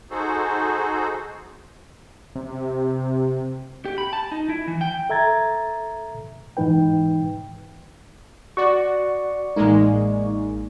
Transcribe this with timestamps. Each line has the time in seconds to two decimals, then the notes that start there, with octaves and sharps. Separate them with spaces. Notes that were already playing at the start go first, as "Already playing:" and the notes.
0.10 D#4 F#4 G#4 A4 C5
2.36 C3
3.85 G4
3.98 B5
4.13 A5
4.32 D#4
4.49 E4
4.68 E3
4.81 G5
5.09 A4 E5 A#5 G#6 A6
6.57 G#2 E3 D#4 B4 G5
8.57 F#4 D5 C#6
9.56 A1 G#3 A#3 D#4